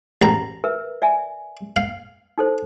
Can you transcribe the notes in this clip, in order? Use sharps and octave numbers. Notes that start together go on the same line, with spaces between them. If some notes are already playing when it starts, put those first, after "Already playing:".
A1 A#5
A#4 B4 E5
D5 E5 G#5
F5
D#4 A4 C5